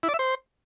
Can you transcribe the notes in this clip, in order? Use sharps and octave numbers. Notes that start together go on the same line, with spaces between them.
E4
D5
E5
C5